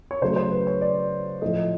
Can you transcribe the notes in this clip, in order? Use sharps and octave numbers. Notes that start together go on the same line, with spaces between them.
C#5
C#3 F#3 A3 C5
C5
B4
C#5
D5
A2 F3 A3 D#5
D#5